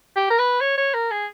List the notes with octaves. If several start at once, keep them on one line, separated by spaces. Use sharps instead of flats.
G4
A#4
B4
C#5
C#5
A#4
G#4